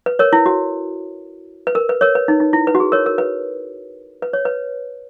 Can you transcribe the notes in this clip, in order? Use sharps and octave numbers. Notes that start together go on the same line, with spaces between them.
B4
A#4 C#5
E4
F#4
B4
A#4
B4
A#4 C#5
B4
D#4
D#4
E4
B4
F#4
G#4
A#4 C#5
A#4
B4
B4
C#5
B4